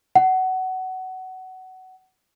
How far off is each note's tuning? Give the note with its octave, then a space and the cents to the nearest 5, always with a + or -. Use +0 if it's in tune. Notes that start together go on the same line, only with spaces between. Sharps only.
F#5 +20